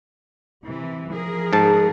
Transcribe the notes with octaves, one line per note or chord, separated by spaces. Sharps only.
C3 E3
F3 G#4 A#4
G#2 A5